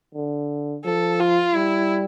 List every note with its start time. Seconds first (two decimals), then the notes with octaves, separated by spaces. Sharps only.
0.15 D3
0.85 F3 A4
1.20 F4
1.55 G3 E4